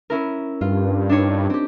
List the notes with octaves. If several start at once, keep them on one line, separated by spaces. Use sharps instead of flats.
C#4 E4 A#4
G2 F4
D4 D#4 C#5
C4 G4